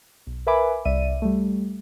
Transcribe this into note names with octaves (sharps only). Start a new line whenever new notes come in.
B1
A#4 B4 E5 G#5 B5 D6
C2 D5 E5 D#7
G3 A3